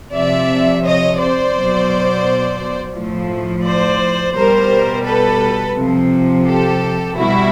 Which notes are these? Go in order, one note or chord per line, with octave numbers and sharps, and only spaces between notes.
C3 F3 D5 E5
C#5 D#5
C5 D5
B2 F#3
A2 F3
C5 D5
B2 G3 A#4 C5
A4 B4
C3 F3
G4 A4
B2 G3 E4 F#4